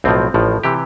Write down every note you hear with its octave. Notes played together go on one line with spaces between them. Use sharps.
B1 A2 F3 C4
A1 A2 F3
C3 E3 G4